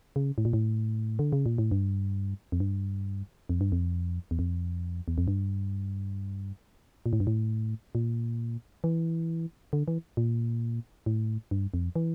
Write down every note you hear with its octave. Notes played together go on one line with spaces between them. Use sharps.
C#3
A2
A#2
A2
D3
C#3
A#2
A2
G2
F2
G2
F2
G2
F2
E2
F2
E2
F2
G2
A#2
A2
G2
A2
A#2
E3
D3
E3
A#2
A2
G2
F2
E3